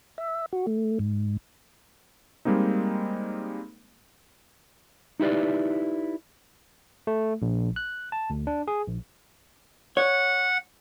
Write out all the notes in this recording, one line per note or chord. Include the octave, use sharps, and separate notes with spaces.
E5
F#4
A3
G#2
G3 G#3 A#3 C4 D#4
D#4 E4 G4 B4 D5
A3
A#1
F#6
A5
D2
D4
G#4
A#1
C#5 F#5